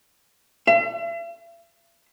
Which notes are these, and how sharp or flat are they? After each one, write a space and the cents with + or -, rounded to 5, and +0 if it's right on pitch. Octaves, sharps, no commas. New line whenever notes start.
E5 +45